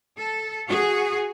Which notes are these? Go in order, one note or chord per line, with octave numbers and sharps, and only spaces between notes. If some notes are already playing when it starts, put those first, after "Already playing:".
A4
F#4 G#4